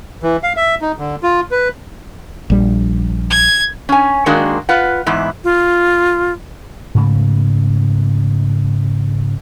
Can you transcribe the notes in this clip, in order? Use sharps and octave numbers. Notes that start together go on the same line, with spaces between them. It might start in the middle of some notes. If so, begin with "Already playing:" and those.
E3
F5
E5
D#4
D3
F4
B4
A#1 G3
G#6
C#4 G#5
D#3 G#3 A#3 D4 F#4
F4 B4 F#5
E2 G#2 E4
F4
G#2 C#3 A3